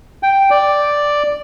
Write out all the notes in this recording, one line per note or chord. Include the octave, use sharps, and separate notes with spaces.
G5
D5